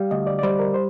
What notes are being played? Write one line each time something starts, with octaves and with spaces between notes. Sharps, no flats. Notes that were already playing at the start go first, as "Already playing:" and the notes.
Already playing: G3 F5
D2 D#5
D5
D5
G3 C5
A#4
C5